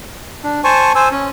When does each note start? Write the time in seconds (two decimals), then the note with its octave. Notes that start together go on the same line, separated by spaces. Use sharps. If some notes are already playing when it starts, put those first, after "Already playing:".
0.43 D4
0.64 C5 G#5 A5 C#6
0.95 C5 G#5 E6
1.11 C#4